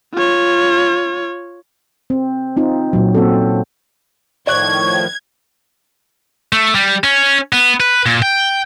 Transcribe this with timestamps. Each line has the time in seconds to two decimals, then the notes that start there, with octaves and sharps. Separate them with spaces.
0.14 F4 C#5
2.10 C4
2.57 C4 D#4 F4
2.93 A#2 F#3
3.15 A#3 C4 C#4 F#4 A4
4.47 A2 D#3 F3 D5 C#6 F#6 G#6
6.52 A3
6.75 G3
7.04 C#4
7.52 B3
7.80 B4
8.06 A#2
8.22 G5